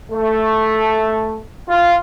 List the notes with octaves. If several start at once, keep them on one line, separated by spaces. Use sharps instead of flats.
A3
F4